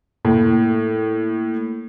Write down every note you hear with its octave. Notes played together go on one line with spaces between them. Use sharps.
A2 A#3